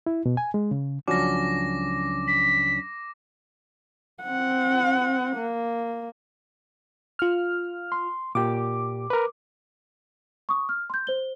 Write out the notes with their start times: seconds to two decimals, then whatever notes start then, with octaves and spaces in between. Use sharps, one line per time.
0.07 E4
0.26 B2
0.37 G#5
0.54 G#3
0.71 C#3
1.08 C#2 F3 F#3 C#4 D4 F#4 D6 A#6
2.27 B6
4.23 C4 F#5
5.36 A#3
7.19 F4 F6
7.92 C6
8.35 A#2 G4 D6
9.10 A#4 B4
10.49 C#6 D#6
10.69 F6
10.90 C6 G6
11.07 C5 G7